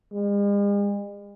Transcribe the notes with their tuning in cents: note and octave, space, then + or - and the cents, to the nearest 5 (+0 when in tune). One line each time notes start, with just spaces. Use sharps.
G#3 -45